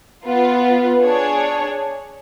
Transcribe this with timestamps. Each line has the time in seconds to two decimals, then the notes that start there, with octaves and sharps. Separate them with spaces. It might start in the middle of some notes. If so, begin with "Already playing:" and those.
0.25 B3 F4 B4
1.02 D4 G#4 C#5